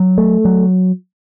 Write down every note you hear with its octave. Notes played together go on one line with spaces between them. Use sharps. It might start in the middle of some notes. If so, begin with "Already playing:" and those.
Already playing: F#3
A3
F#3